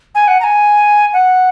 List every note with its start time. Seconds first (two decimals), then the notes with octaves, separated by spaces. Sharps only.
0.15 G#5
0.28 F#5
0.40 A#5
0.44 G#5
1.13 F#5